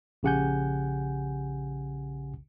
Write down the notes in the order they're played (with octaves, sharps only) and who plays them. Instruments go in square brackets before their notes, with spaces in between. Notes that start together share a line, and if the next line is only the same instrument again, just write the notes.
[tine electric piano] A#1 C#3 G4 F#5 G#5 G6